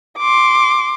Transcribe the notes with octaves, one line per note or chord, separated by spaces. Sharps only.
C6 D6